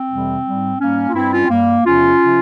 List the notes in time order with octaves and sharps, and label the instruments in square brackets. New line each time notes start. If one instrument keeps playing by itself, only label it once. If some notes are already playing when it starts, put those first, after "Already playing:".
Already playing: [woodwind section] C4
F2 C3 E3 G3
G#2 G3
G#2 G3 A#3 C#4
F4
G2 G3 C4 E4
C#4 F4
C4
G2 G3 A#3
E2 C3 F3 C#4 F4
C3 F3